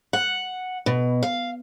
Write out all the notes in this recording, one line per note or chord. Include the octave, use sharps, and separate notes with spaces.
F#5
B2
F5